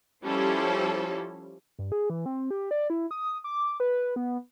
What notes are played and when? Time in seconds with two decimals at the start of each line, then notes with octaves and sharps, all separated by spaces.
0.24 F3 G3 C#4 E4 A4 C5
1.79 G2
1.92 G#4
2.10 E3
2.26 C4
2.50 G4
2.71 D5
2.90 E4
3.11 D#6
3.44 D6
3.80 B4
4.16 B3